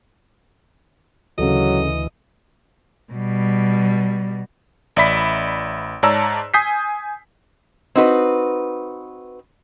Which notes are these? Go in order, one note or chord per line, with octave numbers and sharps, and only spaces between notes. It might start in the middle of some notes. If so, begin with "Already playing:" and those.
D2 C#3 E3 F#3 A4 D#5
B2 G3
A1 D5 E5 B5 B6
G#2 C#5 D5 A5 A#5 E6
G#5 D#6 G6 B6 C7
C4 D#4 F#4 B4